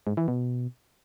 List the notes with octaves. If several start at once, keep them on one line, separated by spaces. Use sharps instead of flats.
G#2
E3
B2